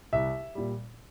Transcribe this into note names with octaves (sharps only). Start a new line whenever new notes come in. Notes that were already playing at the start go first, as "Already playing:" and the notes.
C2 E5
A#2 G3